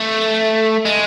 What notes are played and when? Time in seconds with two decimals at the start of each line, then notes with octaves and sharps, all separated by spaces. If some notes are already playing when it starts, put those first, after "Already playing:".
Already playing: A3
0.86 G#3